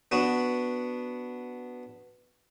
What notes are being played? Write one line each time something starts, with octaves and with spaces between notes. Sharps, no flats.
B3 D4 F#4